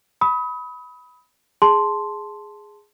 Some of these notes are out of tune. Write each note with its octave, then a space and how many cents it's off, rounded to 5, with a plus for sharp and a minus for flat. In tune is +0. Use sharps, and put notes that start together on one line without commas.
B5 +0 D#6 +35
G#4 +0 A5 +0 C6 +0